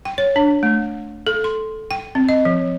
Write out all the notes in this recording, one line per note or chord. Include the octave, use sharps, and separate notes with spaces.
G5
C#5
D4
A3
A4
C6
G5
C4
D#5
F3